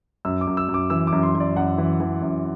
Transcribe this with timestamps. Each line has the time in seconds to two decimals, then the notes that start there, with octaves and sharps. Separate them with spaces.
0.25 F#2 E6
0.41 D6
0.47 F#2
0.57 E6
0.68 F#2
0.74 D6
0.90 E3 E6
1.07 D6
1.12 F#2
1.23 C6
1.35 F#2
1.40 D5
1.56 F#2 F#5
1.78 E3
2.00 E3
2.22 F#2